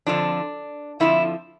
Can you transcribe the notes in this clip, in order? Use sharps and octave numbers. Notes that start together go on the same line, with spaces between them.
F2 D3 F3 D4
F2 D3 F3 E4